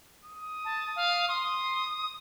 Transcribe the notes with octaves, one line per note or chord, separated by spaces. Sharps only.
D#6
A5
F5
C6 D#6